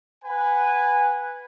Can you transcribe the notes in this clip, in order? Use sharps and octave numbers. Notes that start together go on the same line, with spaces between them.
B4 F#5 G#5